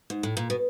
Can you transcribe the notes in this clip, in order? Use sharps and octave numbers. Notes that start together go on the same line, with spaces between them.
G#2
A2
A#2
B2